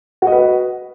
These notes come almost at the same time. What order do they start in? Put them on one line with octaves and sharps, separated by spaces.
F#4 D#5 B4